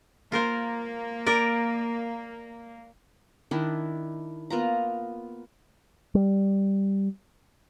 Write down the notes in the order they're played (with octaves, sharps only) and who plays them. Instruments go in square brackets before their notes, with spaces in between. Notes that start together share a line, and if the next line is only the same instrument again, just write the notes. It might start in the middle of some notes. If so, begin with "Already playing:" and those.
[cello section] A#3 [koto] F4 A#4 C5
[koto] A#4 D5
[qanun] D#3 D4 E4
A#3 B3 F4 A#5
[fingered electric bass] G3